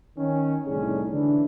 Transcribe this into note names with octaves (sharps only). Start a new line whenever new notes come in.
D#3 C#4
C2 A2 D3 C#4 D#4 G#4
D3 E3 D4